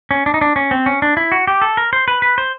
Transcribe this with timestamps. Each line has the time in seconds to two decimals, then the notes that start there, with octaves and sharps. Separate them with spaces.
0.11 C#4
0.26 D4
0.34 D#4
0.41 D4
0.56 C#4
0.71 C4
0.86 C#4
1.02 D4
1.17 E4
1.32 F#4
1.47 G4
1.62 A4
1.77 A#4
1.93 C5
2.08 B4
2.22 B4
2.38 C5